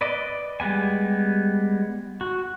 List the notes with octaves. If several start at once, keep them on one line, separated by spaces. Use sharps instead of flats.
B4 D5 D#5
G3 G#3 B3 G#5
F#4